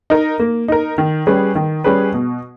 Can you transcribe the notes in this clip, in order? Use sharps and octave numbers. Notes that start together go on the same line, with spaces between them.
D#4 A#4
A#3
D#4 A#4
D#3
G3 C#4 G#4 B4
D#3
G3 C#4 G#4 B4
B2